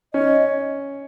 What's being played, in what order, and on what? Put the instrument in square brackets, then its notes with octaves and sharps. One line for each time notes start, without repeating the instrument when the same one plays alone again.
[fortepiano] C#4 [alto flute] D#5